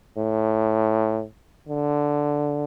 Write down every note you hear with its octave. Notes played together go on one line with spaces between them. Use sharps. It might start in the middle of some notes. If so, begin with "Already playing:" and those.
A2
D3